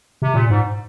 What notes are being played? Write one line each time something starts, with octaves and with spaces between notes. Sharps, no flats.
C3
A#2
G#2